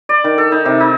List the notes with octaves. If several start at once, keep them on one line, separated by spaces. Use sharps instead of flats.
D5
D#3
A4
D#4
C3
D#4